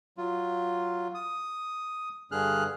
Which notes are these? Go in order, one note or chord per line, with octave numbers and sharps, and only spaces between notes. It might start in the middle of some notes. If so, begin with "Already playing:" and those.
F#3 F4
D#6
G2 D3 G#4 F6 F#6